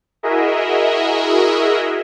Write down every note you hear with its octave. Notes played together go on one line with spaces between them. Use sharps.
E4 F#4 G#4 A#4 D#5 E5